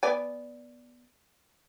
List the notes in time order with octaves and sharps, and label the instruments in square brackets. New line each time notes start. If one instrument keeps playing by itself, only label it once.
[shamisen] B3 D5 G#5